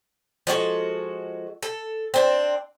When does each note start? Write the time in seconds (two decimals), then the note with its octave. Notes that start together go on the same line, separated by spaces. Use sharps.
0.47 F3 G#3 F#4 A4
1.63 A4
2.14 C4 D4